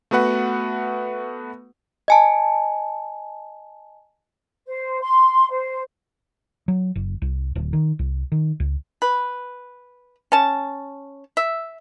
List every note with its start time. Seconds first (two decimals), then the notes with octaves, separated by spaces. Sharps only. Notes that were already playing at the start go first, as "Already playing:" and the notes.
0.11 A3 B3 F#4 B4 F#5
2.08 D#5 G#5 A5
4.67 C5
5.01 C6
5.50 C5
6.68 F#3
6.96 F#1
7.22 C2
7.55 D1
7.73 D#3
7.99 C2
8.32 D#3
8.60 C#2
9.02 B4
10.32 C#4 A5
11.37 E5